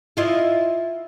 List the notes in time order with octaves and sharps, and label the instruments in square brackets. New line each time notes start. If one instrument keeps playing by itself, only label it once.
[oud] E4 F4 D#5